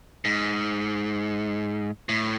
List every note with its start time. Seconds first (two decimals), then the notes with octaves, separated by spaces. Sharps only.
0.25 G#2
2.09 A2